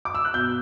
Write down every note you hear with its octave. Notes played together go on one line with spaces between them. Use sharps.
D6
E6
F#6
B2 G6